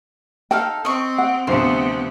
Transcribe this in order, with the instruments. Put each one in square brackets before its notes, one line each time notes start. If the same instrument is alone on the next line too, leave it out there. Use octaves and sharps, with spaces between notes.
[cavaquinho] D#4 A4 F5 [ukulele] G5
[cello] C4 [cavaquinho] D#5 C#6
[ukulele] F#5
[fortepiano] D2 F3 D4 [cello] C3 B3 [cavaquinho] C5